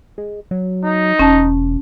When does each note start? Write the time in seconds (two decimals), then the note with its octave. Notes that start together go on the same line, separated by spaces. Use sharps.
0.18 G#3
0.51 F#3
0.84 D#4
1.19 E1 C#4 A5